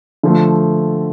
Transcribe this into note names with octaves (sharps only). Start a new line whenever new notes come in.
D3 F3 A3